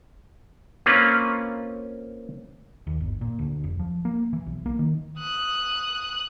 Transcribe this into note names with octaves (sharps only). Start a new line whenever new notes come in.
A#3 C4 C#4 F4 B4
D#2
G1
A#2
D2
F1
F3
A#3
E3
B1
A#3
D#3
D#6 F#6